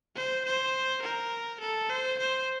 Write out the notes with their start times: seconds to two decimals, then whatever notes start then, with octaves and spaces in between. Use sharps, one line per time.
0.16 C5
0.45 C5
1.02 A#4
1.61 A4
1.90 C5
2.19 C5